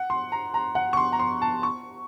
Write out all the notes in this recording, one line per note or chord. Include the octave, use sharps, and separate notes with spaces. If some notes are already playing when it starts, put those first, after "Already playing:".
Already playing: F#5
C6
A#5
A#5
F#5
C#6
C6
A#5
C6
A5
C#6